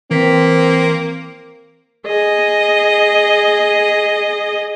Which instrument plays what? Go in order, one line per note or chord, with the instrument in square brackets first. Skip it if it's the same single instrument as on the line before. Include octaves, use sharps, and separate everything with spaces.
[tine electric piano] E3 B6 [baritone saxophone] A#3 [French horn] C4
[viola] G#4 D#5